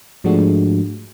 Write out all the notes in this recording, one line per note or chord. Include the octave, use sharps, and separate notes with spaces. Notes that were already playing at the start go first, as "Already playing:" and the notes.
G#2 F3 G#3 A3 D4 F#4